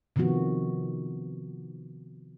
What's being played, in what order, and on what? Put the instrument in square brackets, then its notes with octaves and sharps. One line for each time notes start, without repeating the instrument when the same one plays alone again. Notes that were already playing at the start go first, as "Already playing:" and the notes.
[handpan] C3 D#3 F3 B3 F#4